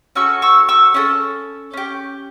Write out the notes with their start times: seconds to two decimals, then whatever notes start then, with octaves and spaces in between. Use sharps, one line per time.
0.16 C#4 F#4 A4 C#6 E6
0.42 C#6 E6
0.69 C#6 E6
0.94 C#4 F#4 A4
1.73 C#4 G4